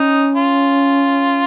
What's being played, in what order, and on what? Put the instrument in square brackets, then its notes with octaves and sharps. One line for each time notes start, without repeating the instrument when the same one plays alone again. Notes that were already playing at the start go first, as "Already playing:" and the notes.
Already playing: [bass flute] C#4 [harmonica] D#4
[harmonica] F4